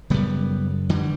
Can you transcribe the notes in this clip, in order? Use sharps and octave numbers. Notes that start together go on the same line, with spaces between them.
F#2 C#3 G3 B3
D3 E3 G3